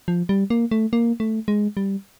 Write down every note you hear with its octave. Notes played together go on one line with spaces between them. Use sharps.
F3
G3
A#3
A3
A#3
A3
G#3
G3